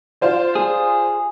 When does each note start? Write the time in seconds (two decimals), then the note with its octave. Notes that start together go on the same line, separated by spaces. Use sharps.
0.21 F4 C5 D5
0.55 G#4